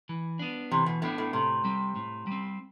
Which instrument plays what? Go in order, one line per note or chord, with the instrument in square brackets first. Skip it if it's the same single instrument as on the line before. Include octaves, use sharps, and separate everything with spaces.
[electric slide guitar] E3
B3 D4
[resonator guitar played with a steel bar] C3 [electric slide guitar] E3
[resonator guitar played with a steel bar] B2
[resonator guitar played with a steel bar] A2 [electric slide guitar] B3 D4
[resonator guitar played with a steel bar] A2
[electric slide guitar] A2 [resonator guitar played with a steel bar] C3
[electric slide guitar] G3 C4
A2
G3 C4